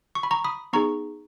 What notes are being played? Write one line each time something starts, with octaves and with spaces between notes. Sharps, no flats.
C#6
B5
A#5 C#6
B5 D#6
B3 D#4 G#4 A#5 C#6